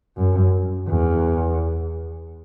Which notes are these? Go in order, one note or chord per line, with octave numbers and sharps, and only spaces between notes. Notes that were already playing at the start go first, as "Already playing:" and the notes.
F#2
E2